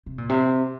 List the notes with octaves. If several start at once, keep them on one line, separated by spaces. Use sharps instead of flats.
C3
A#2
C3